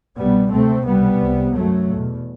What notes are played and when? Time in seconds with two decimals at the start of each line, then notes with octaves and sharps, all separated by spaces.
0.17 C2 B2 G3 B3
0.52 D2 C3 A3 C4
0.86 C2 B2 G3 B3
1.21 C2 C3
1.56 F#2 F#3 A3
1.91 E2 B2